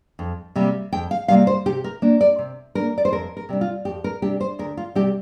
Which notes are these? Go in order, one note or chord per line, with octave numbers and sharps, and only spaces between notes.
F2
C3 G3 A#3
F2 G5
F5
C3 G3 A#3 F5
C5
C3 G4
A#4
A#3 D4
D5
C3
A#3 D4 A#4
D5
C5
F2 A#4
A#4
C3 G3 D4
F4
F2 G4
A#4
C3 G3 D4 G4
C5
D2 A#4
F4
C3 G3 G4